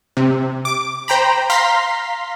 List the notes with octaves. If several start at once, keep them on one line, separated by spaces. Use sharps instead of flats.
C3
D6
C5 G5 A#5 B5
F5 A#5 C6 B6